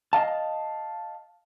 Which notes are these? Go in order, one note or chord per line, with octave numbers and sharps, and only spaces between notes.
D#5 F5 A5